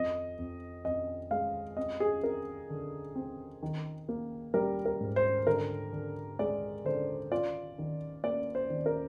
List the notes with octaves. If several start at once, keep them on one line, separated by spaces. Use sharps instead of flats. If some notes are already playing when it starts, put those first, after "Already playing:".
Already playing: F2 D#5
F2
F2 D#5
G#3 F5
C4 D#5
G#4
C4 A#4
D3
C4
D#3
A#3
G3 A#4
A#4
G#2
C5
D3 A#4
D3
G#3 D5
D3 C5
F4 D5
D#3
A#3 D5
C5
D#3
A#4